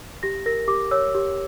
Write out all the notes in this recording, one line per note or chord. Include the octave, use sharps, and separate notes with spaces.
G4 A#6
A#4 A#6
G4 D6
C#5 E6
G4